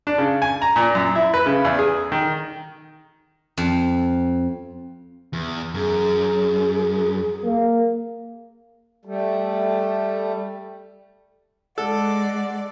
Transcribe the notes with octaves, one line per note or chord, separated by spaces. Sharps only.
D4
C#3
G#5
A#5
A#2
F#2
E4
B4
C#3
E2
G#4
D#3
F2
E2
F#2 G#4
A#3
G3 A3
G#3 A4 D5 F#5